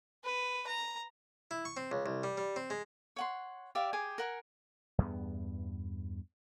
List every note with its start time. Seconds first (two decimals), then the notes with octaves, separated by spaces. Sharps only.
0.24 B4
0.67 A#5
1.51 E4
1.65 C#6
1.77 C4
1.92 C#2
2.06 C2
2.24 G3
2.38 G3
2.56 C4
2.70 G#3
3.16 C#5 F#5 C6
3.75 G4 D5 E5 F5
3.93 G4 G#4 G#5 D6
4.18 A#4 F#5 G#5
4.98 E2 G2 B3